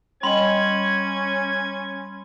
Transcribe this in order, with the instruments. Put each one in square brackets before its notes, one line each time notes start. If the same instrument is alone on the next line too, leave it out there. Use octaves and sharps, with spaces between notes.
[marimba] G3 D#5 [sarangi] C#4 [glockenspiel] B5 C6 F#7 [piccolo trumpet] G#6